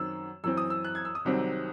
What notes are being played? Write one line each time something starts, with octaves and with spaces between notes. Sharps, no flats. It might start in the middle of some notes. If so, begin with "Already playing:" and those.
Already playing: F#2 D#3 F#3 C4 E6
F#2 E3 C4 E6
D#6
E6
F#6
G#6
E6
D#6
C2 C3 D#3 F#3 C4